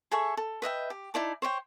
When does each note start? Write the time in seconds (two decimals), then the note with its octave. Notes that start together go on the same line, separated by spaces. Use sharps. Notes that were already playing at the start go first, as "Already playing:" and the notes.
0.12 G#4 A4 E5 C#6
0.37 A4
0.62 B4 D#5 E5 G5
0.90 G4
1.14 D#4 E4 D5 A5
1.42 C5 C#5 E5 G5